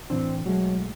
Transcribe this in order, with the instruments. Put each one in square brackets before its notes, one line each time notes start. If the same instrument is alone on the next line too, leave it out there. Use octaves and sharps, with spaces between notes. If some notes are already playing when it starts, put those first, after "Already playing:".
[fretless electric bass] A2 E3 D4 [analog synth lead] C4
[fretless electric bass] B1 G#3 A3 [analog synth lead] F#3